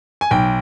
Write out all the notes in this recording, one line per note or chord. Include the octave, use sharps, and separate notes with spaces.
G#5
B1 G5